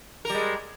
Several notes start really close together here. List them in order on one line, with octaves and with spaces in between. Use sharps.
A#4 G3 G#3